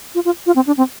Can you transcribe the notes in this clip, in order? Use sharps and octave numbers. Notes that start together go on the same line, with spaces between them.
F4
F4
F4
C4
D4
C4